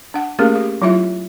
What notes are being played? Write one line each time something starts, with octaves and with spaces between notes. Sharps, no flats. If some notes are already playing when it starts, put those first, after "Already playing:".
D4 F#5
A3 A#3 C#4 G4 G#4 A#4
G4
F#3 E4 F4 E5